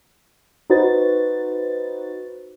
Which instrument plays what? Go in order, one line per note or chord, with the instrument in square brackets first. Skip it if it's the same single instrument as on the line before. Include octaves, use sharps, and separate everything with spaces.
[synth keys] D#4 F#4 B4 C5 A6